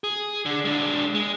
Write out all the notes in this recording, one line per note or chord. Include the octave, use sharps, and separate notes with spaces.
G#4
D3
G#3 D4
G#3